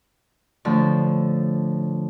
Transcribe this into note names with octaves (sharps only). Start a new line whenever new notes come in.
A2 D3 F3